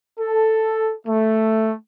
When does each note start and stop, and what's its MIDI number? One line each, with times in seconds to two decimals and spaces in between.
0.19 0.92 69
1.07 1.73 57